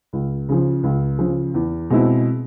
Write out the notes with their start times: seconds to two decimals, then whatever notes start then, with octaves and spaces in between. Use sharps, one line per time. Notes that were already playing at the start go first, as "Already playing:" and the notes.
0.13 C#2
0.49 C#3 F3
0.83 C#2
1.19 C#3 F3
1.54 E2
1.90 B2 G#3 C4 E4